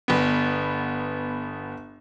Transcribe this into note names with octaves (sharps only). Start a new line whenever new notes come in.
G1 B3